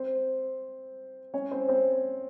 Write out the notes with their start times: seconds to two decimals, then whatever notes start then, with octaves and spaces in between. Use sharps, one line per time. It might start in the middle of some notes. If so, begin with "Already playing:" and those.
Already playing: C4 C5
1.34 C#4 C#5
1.51 C4 C5
1.69 C4 C5